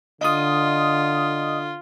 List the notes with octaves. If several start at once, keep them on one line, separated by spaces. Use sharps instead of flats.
D3 F4 D#5 D#6